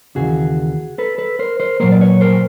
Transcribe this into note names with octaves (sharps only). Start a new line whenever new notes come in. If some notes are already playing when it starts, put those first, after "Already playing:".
D#2 C#3 E3 F#4 G#4
A4 B4
A4 B4
A#4 C5
A#4 C5
A#2 F#3 A#3 A#4 C5
D5
B4 C#5
A#4 C5